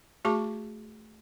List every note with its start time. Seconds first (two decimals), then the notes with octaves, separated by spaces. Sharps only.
0.25 A3 F#4 G#4 A5 C#6 D6